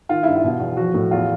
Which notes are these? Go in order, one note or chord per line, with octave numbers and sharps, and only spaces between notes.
D#3 F4
G2 E4
F4
B2
E2
F3 F#4
A2
E2 F4